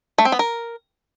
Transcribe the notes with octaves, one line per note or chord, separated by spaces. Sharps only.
A3
C4
B3
A#4